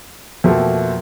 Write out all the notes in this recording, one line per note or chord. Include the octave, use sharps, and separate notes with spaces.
F2 B2 A3 A#3